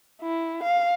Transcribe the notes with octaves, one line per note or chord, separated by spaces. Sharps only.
E4
F5